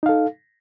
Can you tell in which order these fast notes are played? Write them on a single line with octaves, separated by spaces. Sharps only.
D#4 F5 A4